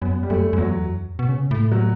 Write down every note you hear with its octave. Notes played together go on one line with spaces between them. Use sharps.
F#2 B3
G3
F#2 A3
F#2
E2 F#3
F#2
B2
C#3
A2
F#3